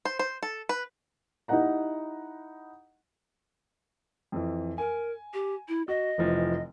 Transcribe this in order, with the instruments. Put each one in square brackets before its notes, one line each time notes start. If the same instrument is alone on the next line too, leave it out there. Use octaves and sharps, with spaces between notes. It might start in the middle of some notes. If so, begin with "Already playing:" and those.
[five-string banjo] C5
C5
A4
B4
[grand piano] D#4 E4 G4 D#5 F#5 A#5
F2 E3
[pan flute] A#4 [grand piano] G#5
[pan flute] G4
E4
[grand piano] F#4 [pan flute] D#5
[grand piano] F1 E3 F3